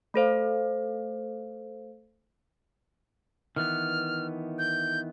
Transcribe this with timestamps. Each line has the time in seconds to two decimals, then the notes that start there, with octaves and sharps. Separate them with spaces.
0.14 A3 A4 C5 F5
3.56 D#3 E3 B3 F6
4.59 G6